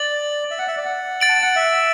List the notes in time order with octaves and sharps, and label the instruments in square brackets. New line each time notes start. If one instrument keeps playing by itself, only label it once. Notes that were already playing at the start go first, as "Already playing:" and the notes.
Already playing: [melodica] D5 [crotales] A6 F#7
[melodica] E5
F#5
E5
D5
F#5
[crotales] A6 D7 F#7
[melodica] A5
F#5
E5